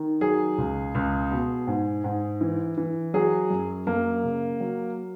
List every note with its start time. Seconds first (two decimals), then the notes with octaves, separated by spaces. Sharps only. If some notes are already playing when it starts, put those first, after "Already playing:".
Already playing: D#3
0.21 F#3 G#4
0.58 C#2
0.95 C#2
1.31 B2
1.67 G#2
2.04 G#2
2.41 E3
2.77 E3
3.14 F#3 G#4
3.50 F#2
3.87 F#2 A#3
4.24 C#3
4.60 F#3